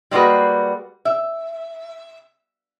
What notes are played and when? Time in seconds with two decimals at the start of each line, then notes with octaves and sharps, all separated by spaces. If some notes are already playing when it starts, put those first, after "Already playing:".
0.11 G3 G#3 A#3 F#4 B4
1.05 E5